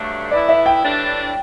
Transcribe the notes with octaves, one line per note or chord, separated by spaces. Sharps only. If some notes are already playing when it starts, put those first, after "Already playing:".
Already playing: G2 F#3 A3 D4
E3 B3 E4 A4 D5
E5
G5
A2 E3 G3 D4